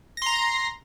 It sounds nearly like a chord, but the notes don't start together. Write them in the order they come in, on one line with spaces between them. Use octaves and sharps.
A#6 C6 A#5